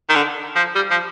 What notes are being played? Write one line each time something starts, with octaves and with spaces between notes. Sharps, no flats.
D#3
D3
F3
G3
F3